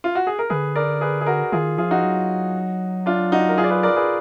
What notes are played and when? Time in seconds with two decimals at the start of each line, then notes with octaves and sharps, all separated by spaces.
0.04 F4
0.15 F#4
0.27 G#4
0.39 A#4
0.50 D3 G#4 B4
0.75 A#4 D5
1.01 G#4 B4
1.21 G#4
1.26 F#4 A#4
1.52 D#3 F4 G#4
1.78 F3 F4 G#4
1.91 D#4 F#4
2.04 F#3
3.06 D4 F4
3.32 D#4 F#4
3.49 A#4
3.58 F4 G#4
3.64 D5
3.70 G#4 B4
3.83 A#4 D5
3.96 G#4 B4